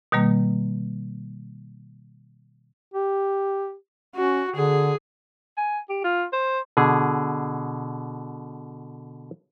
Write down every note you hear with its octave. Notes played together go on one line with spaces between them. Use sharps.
B2 D#3 G3 A#3
G4
C#4 F#4
D3 G#4
G#5
G4
F4
C5
B2 D3 G#4